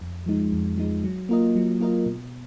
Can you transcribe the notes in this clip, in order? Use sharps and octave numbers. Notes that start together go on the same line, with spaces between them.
F2
F3 G#3 D#4
F2
F3 G#3 D#4
F#3
A#3 F4 A#4 D#5
F#3
A#3 F4 A#4 D#5
B2